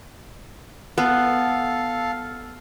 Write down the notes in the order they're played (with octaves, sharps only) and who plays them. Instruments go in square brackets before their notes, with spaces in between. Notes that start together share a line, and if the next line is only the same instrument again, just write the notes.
[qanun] B3 [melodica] A4 F5